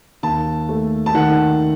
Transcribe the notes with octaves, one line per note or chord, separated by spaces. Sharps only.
D#2 A5
A3
A5
D#3 F#5